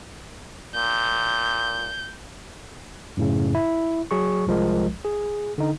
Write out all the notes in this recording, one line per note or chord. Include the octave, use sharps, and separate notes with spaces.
A#2 G6
F#2 A2 C#3
E4
F#3 G#4 C#6
C2 F3 G#3 A#4
G#4
D3 D#4